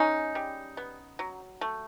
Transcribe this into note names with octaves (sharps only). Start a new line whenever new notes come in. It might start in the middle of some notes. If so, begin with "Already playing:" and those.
Already playing: G#3 C#4 D#4
G3
B3
F#3
A3